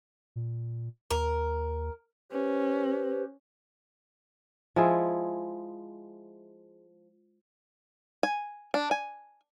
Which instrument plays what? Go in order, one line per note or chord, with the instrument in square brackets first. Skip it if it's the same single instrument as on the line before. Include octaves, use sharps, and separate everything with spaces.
[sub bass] A#2
[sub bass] D#2 [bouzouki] A#4
[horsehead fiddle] C#4 [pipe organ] G4 B4 C5
[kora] F3 G#3 E4 G#4
[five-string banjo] G#5
D4
G#5